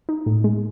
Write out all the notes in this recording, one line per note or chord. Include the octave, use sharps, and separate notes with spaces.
D#4
A2
G#3